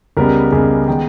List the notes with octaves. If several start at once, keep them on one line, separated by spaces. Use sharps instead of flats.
C#2 C#3 G3 B3 A#4
C#2 C#3 G3 B3 G#4
D#3 G#3 B3 G5